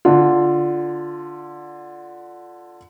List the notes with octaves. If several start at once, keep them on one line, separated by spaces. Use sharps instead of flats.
D3 F4